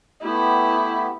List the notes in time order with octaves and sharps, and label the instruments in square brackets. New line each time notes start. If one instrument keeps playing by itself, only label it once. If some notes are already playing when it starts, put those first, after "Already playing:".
[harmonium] A3 B3 G4 [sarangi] E4